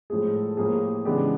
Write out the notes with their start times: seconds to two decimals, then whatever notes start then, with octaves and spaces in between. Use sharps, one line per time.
0.10 A2 F3 G#3 G#4
0.35 A4
0.57 A2 F3 A#3 G#4
0.74 G4
1.05 C#3 E3 G#3 B3 D4 G4